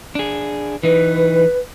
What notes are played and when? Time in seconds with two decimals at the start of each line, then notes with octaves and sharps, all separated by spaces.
0.15 D4 G#4
0.83 E3 D#4 B4